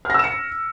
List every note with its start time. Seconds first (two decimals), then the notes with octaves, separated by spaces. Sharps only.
0.05 F6
0.10 A#6
0.14 E6
0.19 E7
0.24 C#7